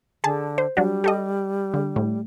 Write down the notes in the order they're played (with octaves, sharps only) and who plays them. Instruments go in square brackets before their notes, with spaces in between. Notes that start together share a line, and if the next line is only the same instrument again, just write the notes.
[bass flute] D3 [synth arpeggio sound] G#4 A5
[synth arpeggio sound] C5
[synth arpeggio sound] F#3 D4 F#4 [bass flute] G3
[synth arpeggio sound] G4 A4 D#5
D3
A2